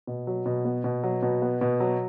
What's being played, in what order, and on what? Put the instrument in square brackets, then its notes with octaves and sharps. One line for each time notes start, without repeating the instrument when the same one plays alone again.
[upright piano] B2
F#3
B2
B3
B2
F#3
B2
B3
B2
F#3